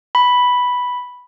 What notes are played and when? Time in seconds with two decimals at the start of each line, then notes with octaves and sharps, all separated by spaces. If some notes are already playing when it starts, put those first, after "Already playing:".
0.15 B5